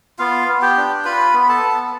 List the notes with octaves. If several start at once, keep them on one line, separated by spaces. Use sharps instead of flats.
B3 F4 F5
B3
G4 G5
D4
F4 B4 B5
B3
B5
A4 A5
B3